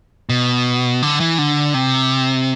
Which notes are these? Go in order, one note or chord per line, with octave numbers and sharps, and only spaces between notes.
B2
D3
E3
D3
C3